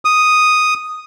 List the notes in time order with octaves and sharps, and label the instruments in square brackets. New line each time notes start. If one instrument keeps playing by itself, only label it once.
[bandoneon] D#6